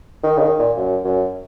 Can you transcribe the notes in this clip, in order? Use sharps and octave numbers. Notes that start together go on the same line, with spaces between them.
D#3
C#3
D#3
A#2
F#2
F#2